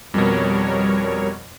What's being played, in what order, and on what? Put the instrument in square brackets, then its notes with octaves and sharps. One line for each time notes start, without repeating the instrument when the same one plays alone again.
[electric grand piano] F2 B2 [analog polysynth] G3 A#4 C#5